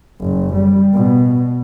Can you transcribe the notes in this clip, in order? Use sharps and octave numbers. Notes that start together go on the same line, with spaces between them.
F#1
G3
B2